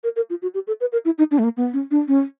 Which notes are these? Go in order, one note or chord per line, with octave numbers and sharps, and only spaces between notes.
A#4
A#4
F4
F#4
G4
A4
B4
A#4
E4
D#4
D4
A3
A#3
B3
C#4
D4
C#4